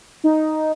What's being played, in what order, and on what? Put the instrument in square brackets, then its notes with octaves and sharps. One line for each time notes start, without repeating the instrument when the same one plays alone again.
[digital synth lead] D#4